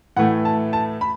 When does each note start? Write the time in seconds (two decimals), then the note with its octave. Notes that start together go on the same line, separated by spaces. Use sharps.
0.16 A2 E3 A3 F#5
0.45 A5
0.73 A5
1.01 B5